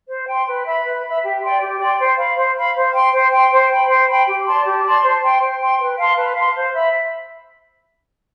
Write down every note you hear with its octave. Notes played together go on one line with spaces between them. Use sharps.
C5
G5 C6
B4
E5 B5
B4
E5 B5
G4
D5 G5 C6
G4
D5 G5 C6
C5
F5 B5
C5
F5 B5
C5
G5 C6
C5
G5 C6
C5
G5 B5
C5
G5 B5
G4
D5 A5 C6
G4
D5 A5 C6
C5
G5 C6
C5
G5 C6
B4
F5 A5 C6
B4
F5 A5 C6
C5
E5 B5